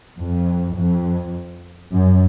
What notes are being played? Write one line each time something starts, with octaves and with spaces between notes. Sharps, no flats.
F2
F2
F#2